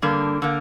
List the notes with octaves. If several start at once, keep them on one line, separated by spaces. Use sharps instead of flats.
G2 D3 A#3
D3 A#3